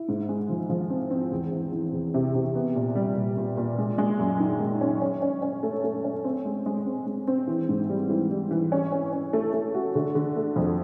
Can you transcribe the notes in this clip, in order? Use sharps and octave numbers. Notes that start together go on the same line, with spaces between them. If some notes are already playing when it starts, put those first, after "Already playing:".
Already playing: E4
G#2
G#3
F3
F3
C4
C4
E2
E3
E3
E2
C3
C3
B3
A#2
G3
A#2
A#2
A#2
G#3
G#3
F#2
D#3
G#3
C#4
C#4
C#4
C#4
A3
A3
C#4
C4
G#3
G#3
C4
G#3
C4
E3
G#2
G3
E3
G3
E3
C#4
C#4
C#4
A3
A3
F#4
D3
D3
A3
F2